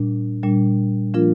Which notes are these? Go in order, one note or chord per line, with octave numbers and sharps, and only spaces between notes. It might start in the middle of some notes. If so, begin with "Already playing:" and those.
Already playing: A#2 G3 D4
A#2 G3 D4
F3 A#3 D4 F4 A#4